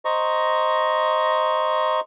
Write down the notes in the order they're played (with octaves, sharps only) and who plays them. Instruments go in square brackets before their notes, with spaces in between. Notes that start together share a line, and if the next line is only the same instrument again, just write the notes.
[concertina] C5 D#5 A#5 C#6